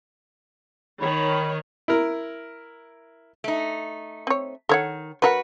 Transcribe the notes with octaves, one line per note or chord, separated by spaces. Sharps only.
D#3 C#5 B5
E4 A#4
A3 D#4
C4 C#5
D#3 A4 C#5 F#5
F#3 F#4 A#4 B4 F#5